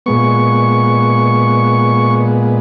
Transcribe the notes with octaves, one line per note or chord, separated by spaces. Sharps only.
A#2 G#3 B3 C#6